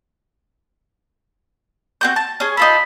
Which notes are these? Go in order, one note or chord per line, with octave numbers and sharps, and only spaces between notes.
C4 F#4 G6
A5
C#4 G#4
D#4 F4 A4 B5